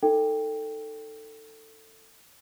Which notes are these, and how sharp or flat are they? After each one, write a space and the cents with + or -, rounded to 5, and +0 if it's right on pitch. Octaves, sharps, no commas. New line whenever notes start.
D#4 +0 A4 +15 G5 +0